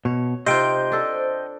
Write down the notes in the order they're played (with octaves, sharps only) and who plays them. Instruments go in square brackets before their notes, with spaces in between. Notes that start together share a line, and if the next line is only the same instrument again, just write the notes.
[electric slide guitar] B2 [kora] C#5
[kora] C3 D#4 F4 [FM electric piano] C5 G6 [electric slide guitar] D#5 G5
[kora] D4 A4